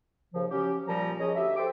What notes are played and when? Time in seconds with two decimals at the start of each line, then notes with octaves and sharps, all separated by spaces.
0.33 D#2 C#3 F3
0.49 F#3 C#4 G4
0.87 A#2 F3 G3 A#5
1.19 C#4 G#4 D#5
1.35 D2 G4 E5
1.57 G4 A4 C5 G5 D6